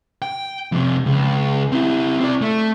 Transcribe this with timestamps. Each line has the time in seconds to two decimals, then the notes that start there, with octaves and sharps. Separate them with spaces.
0.22 G5
0.72 F2 C3
1.06 C#2
1.72 C4 E4
2.20 C4 D5
2.41 A3